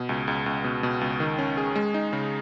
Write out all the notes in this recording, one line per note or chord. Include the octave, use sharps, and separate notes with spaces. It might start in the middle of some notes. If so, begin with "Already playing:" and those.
Already playing: B2
C#2
C#2
C#2
B2
B2
C#2
D#3
C#4
G#4
G#3
D#4
C#3